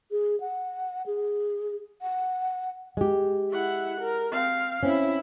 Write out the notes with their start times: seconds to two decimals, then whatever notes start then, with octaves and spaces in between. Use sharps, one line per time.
0.11 G#4
0.40 F#5
1.06 G#4
2.02 F#5
2.97 G#3 G4
3.51 E4 F#5
4.00 A#4
4.31 C4 F5
4.83 C4 C#4 E4